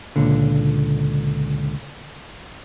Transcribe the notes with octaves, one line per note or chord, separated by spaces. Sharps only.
C#2 A#2 D3